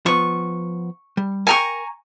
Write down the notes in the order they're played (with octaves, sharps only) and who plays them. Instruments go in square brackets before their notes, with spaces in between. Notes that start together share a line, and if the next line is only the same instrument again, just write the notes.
[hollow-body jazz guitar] F3 B3 [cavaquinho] C#6
[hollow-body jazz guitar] G3
[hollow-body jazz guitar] A#4 G5 [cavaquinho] G#5 A#5 C#6